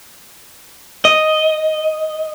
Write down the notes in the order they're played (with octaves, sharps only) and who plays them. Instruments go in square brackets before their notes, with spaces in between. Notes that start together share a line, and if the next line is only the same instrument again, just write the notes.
[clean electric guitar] D#5